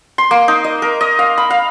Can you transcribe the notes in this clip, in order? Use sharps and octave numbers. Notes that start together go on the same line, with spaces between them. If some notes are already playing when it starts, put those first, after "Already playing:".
C6
A#3
D#4
D#5
A#4
D#5
F5
B5
F5